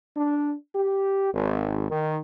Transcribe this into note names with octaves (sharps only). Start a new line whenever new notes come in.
D4
G4
G#1
D#3